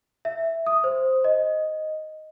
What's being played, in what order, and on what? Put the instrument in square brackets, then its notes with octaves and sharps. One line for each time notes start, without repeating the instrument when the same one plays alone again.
[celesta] E5
D#6
C5
D#5